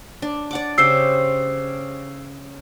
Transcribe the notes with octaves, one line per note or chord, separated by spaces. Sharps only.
D4
D5 F#5 D6
C#3 G4 C5 E6 C7